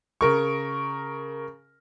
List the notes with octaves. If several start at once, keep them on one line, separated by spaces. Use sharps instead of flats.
C#3 A#4 C#6